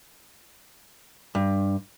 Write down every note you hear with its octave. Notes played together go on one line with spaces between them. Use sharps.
G2